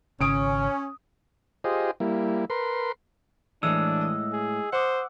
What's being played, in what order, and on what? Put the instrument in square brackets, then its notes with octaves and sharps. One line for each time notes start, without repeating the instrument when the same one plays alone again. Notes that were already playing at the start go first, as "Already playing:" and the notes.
[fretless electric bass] G#1 C#3 [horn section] C#4 [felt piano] D#6 D7
[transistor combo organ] F4 G4 G#4 C5 D#5
G3 A#3 E4
A#4 B4 C6
[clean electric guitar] A2 G#3 [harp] E3 [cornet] D4 [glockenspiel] E6
[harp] D#5
[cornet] G#4
[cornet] C5 [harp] F#5 D6 D#6